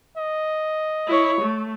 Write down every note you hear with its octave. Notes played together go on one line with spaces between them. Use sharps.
D#5
E4 C#5
A3